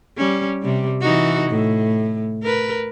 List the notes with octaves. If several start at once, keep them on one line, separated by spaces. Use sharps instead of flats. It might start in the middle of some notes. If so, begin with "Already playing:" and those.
G3 C#4
C3 G3
E3 D#4 F#4
A2
A#4 B4